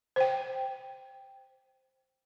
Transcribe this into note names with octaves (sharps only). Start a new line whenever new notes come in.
C5 G5